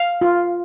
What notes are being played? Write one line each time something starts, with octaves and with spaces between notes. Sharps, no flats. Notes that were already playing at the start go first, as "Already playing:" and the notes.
Already playing: F5
F4